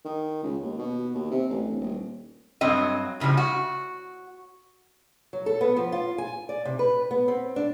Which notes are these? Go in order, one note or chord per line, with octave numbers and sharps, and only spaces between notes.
D#3
C#2
D#2
B2
D#2
C3
A1
D1
D#1
G2 F#3 C4 D#5
A2 C#3 F3 G3
F#4
F#3
A4
B3
F3
F4
G#5
D5
C3
B4
B3
C4
D4